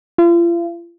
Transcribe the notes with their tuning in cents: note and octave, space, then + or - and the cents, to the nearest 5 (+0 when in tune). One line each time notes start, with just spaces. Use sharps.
F4 -40